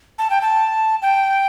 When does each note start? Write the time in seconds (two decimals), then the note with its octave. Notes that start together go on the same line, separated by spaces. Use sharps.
0.19 A5
0.30 G5
0.41 A5
1.02 G5